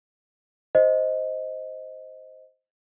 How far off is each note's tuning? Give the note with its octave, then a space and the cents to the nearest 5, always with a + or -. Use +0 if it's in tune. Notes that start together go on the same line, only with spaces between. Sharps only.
C5 +0 D#5 +0